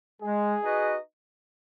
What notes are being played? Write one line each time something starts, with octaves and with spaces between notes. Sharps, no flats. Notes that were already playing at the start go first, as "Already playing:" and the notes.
G#3 G#4
D#4 F#4 B4 D#5